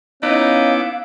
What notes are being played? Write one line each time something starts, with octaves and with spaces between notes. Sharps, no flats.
B3 C#4 D#4 E4 F5 D6